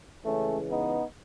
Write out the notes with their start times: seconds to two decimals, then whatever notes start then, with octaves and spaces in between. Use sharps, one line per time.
0.24 C#3 E3 G#3 A3 C#4
0.70 B3 D#4